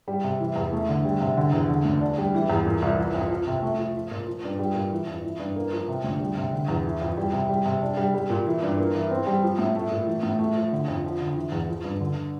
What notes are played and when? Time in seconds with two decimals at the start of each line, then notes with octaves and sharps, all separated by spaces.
0.08 G3
0.24 C3
0.40 E3
0.56 E2
0.73 A3
0.89 D3
1.05 G3
1.21 C3
1.37 D3
1.52 E2
1.69 D3
1.85 D2
2.01 D4
2.18 G3
2.34 E3
2.50 E2
2.66 A#2
2.82 C2
2.98 E3
3.14 F2
3.31 F3
3.47 C3
3.62 A3
3.78 F3
3.94 F3
4.11 A#2
4.27 F3
4.44 G2
4.59 G3
4.75 A#2
4.92 E3
5.07 F2
5.24 E3
5.39 G2
5.56 A#3
5.72 F3
5.88 C3
6.04 D2
6.20 G3
6.37 C3
6.52 D3
6.68 E2
6.85 E3
7.02 F2
7.17 G3
7.33 C3
7.49 G3
7.66 C3
7.82 D4
7.97 G3
8.14 G3
8.30 A#2
8.46 E3
8.63 G2
8.78 A#3
8.95 E3
9.11 C4
9.27 G3
9.43 F3
9.59 A2
9.76 A3
9.91 A#2
10.07 E3
10.23 A2
10.39 A3
10.56 F3
10.72 D3
10.88 F2
11.04 F3
11.20 D3
11.36 E3
11.52 E2
11.69 F3
11.84 G2
12.00 D3